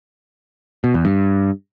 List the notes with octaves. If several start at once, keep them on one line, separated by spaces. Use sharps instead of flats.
B2
E2
G2